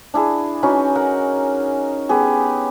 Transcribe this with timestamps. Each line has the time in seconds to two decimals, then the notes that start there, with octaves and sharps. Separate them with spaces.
0.14 D4 E4 G#4
0.63 C#4 D#4 F#4 B4
0.95 A#4 F#5
2.09 B3 G4 G#4